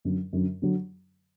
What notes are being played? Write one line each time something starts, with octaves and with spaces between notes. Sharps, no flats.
F#2 D3 F#3
F#2 D3 F#3
D3 F#3